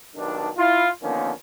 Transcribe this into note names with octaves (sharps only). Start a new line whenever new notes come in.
B1 G2 D#3 D4
E4 F4
D3 D#3 F3 A#3 B3 C#4